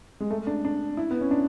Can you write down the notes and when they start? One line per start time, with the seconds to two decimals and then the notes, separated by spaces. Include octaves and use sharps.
0.20 G#3
0.30 A3
0.47 D4
0.65 D4
0.97 E4
1.11 B3
1.21 C#4
1.31 D4